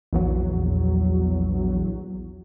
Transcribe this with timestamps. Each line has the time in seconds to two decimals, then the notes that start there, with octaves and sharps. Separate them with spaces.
0.13 A#1 E2 F#3